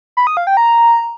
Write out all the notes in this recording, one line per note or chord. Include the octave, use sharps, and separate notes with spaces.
B5
D#6
F5
G5
A#5